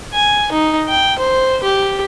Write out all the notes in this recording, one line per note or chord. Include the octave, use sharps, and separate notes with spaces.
G#5
D#4
G5
C5
G4